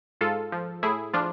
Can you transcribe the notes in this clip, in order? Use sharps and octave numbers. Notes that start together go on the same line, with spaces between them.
G#2 F4 A4
F3
A2 E4 G#4
F3 D4 F4